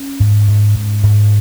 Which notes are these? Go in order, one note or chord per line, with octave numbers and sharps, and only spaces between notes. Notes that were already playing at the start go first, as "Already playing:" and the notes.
Already playing: C#4
G#2
G#2
G#2
G#2